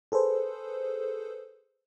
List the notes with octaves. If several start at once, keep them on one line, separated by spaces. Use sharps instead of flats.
G#4 A4 B4 C5